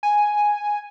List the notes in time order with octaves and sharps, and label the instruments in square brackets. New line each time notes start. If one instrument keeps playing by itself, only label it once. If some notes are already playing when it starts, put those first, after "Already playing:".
[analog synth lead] G#5